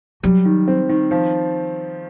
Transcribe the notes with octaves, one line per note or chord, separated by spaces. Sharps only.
F#3 G3
D#3
C4
D#3
F3